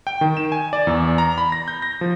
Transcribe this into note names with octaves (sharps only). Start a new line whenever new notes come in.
G5
D#3
E7
G#5
D5
E2
A#5
B5
A#6
G6
A#6
F3